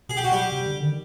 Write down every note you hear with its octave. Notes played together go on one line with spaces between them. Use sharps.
B2 G#4
G4
F#4
G3 G4
C3
D3
D#3